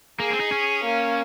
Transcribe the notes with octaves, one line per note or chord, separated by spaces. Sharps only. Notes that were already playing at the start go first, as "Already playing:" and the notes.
A#3 G#4
C4
D#4
C#4
A#3